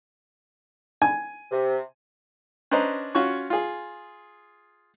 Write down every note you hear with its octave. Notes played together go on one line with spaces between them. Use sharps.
G#5
C3
C#4 D4 B4 C5 D#5 A#5
C#4 F4 F#4 C#5 C#6
F4 G#4